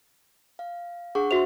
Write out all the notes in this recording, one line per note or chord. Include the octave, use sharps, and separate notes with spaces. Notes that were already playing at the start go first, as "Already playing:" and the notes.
F5
D4 G#4 F#5 C#6
F#4 C5 E5 C6 F7